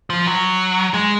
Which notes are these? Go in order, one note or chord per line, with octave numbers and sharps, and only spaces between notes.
F3
F#3
G#3